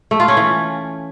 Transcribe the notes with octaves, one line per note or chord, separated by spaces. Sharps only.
A3
F4
C#4
E3